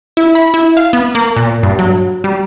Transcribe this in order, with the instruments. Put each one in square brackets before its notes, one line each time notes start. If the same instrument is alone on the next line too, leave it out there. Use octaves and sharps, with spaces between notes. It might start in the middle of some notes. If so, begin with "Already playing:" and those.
[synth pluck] E4
B5
E4
F5
B3
A#3
A#2
G2
F#3
G3